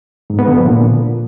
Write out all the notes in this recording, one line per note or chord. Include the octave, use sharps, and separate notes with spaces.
G#2
B3
D3
F3
A#2